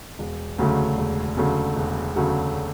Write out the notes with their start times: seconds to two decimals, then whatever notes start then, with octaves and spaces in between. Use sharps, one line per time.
0.19 E1
0.58 D2 C#3 F#3 A3
0.98 E1
1.37 D2 C#3 F#3 A3
1.77 E1
2.16 D2 C#3 F#3 A3